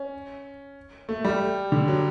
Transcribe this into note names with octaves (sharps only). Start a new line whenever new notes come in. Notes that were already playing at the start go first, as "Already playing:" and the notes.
Already playing: C#4
A3
G3
D3
F#3